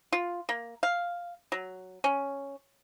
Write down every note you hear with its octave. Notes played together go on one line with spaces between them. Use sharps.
F4
A#3
F5
F#3
C#4